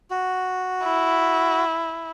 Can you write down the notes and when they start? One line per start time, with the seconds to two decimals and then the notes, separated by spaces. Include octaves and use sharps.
0.10 F#4
0.84 E4